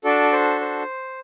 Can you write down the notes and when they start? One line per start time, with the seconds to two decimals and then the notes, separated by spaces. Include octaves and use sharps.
0.04 D4 F#4 A4 D5
0.32 C5
0.61 C5